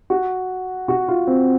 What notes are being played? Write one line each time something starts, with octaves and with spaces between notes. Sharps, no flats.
F#4
F#4
F4
C4